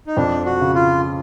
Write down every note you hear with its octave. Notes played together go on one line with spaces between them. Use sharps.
D#4
F2 D4
F#4
C#3
F4